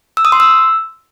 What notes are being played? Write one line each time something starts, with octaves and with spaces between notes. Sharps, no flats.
E6
D#6
C6
E6